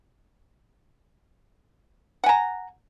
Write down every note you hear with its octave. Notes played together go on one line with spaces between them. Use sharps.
F#5 G#5 A#5